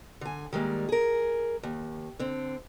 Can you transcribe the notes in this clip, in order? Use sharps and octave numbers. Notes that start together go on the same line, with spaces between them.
D3 G#5
D#3 G3 G#3 A#3
G#4 A#4
D#2
D3 C4